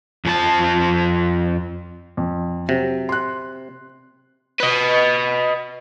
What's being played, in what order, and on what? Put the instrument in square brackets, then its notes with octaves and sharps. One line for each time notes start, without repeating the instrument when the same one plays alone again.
[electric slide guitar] F2 F3 G#5 A5
[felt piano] F2
[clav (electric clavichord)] C3 [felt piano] F#3
[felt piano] C6 F#6
[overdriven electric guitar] B4 D#5